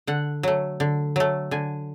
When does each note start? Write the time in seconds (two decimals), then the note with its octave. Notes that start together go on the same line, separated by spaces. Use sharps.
0.07 D3 F#5
0.43 F#3 A3
0.80 D3
1.16 F#3 A3
1.51 D3 G#5